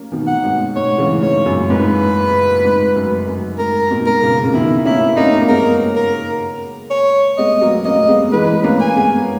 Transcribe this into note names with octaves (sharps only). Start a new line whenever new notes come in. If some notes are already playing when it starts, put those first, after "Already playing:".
Already playing: A#3 C#4
B2 D#3
F#5
G#2 B2
G#2 C#5
C#3 E3
G#2 C#5
F#2 A#2
G#2 B4
G#2
F#2
F#2
G#2 A#4
G#2 B2
A#4
A#2 C#3
C#3
B2 D#3 E4
A#3 C#4 E4
A#3 C#4 D#4
A#3
G#3 B3 A#4
A#4
C#5
G#3 B3 D#5
F#3 A#3
A#3 C#4 D#5
G#3 B3
E3 G#3 B4
A#3 C#4
G#5
G#3 B3